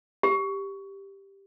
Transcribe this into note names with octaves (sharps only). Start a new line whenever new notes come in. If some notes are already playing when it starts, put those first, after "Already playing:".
G4